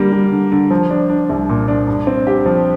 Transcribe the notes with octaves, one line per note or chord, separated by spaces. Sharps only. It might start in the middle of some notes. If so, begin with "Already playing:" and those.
Already playing: D3 G3 A#3
G3
D3
D3
F3
D4
D4
C2
A#2
D4
G2
C4
G4
F3